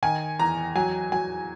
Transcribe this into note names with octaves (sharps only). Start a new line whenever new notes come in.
D#3 G#5
E2 A#5
F#3 G#5
F#3 G#5